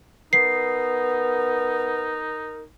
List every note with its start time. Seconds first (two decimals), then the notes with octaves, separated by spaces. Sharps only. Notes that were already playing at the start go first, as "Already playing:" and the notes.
0.33 B3 D#4 A#4 C7